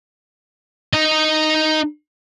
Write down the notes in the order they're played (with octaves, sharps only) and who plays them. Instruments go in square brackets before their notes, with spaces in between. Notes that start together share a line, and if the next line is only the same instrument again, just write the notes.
[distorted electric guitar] D#4 D#5